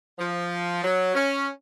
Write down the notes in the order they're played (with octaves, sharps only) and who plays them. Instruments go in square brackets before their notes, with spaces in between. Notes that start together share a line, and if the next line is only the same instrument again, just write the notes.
[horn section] F3
F#3
C#4